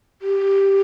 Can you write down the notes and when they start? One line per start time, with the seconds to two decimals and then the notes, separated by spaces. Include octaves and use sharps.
0.22 G4